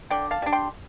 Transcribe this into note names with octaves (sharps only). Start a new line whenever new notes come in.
D3 D5 G5
F5 A5
G3 D4
G5 C6